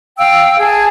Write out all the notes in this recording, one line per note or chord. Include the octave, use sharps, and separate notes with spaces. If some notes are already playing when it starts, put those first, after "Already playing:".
F5 G5 E6
G#4 A5